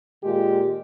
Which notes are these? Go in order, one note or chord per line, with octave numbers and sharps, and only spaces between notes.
A#2 D#3 G#3 F4 G4 G#4